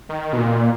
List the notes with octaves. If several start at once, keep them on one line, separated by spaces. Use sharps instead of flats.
D#3
B2
A#2